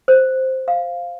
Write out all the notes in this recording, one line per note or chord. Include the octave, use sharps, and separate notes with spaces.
C5
F5